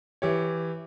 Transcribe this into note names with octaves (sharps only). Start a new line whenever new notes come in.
E3 G4 C#5